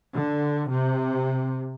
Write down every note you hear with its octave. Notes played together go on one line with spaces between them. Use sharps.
D3
C3